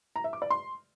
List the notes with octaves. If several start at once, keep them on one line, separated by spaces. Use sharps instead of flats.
A#5
E5
D6
D5
C6